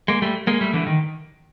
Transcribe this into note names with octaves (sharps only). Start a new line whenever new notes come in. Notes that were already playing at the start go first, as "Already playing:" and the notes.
G#3 A#3
G3 A3
G#3 A#3
G3 A3
D3 E3
D#3